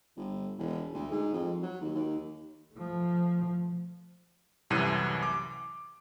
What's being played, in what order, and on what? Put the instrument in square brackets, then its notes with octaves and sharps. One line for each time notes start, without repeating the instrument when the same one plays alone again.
[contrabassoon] G1
E1
D2
G#2
F2
F#3
D#2
D#2
[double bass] F3 A3
[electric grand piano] C2 F#2 A2 C3 E3 D#7
D6